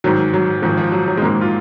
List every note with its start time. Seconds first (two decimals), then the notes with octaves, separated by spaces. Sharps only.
0.04 G#2 D#3 F#3
0.34 F#3
0.62 G#2 D#3 F3
0.77 F3
0.92 F#3
1.08 F#3
1.17 G#3
1.22 G#2 D#3 A#3
1.41 F4